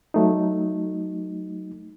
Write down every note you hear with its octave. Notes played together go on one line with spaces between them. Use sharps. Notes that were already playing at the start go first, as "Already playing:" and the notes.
F#3 A3 D#4